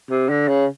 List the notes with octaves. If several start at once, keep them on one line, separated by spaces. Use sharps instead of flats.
C3
D3
C#3